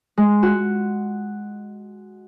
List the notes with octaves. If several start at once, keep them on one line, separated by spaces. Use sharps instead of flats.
G#3
F#4